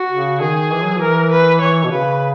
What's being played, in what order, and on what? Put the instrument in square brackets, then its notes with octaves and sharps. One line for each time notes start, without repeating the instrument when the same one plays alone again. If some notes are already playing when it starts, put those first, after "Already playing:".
Already playing: [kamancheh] F#4
[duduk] C#3
[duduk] D#3 [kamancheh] G#4
[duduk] E3
F#3
[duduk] E3 [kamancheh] A#4
[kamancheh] B4
[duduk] E3 [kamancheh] C#5
[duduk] B2
[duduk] C#3 [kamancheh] B4